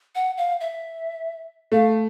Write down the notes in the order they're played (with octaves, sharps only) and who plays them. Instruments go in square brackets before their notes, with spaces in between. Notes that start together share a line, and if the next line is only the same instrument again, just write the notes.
[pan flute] F#5
F5
E5
[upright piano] A3 [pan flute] F5